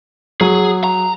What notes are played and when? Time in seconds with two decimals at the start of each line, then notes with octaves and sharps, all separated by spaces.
0.41 F#3 G#4
0.84 A#5